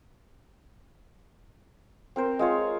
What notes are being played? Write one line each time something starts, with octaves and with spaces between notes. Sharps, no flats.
C4 A#4 C5
G#3 F4 C#5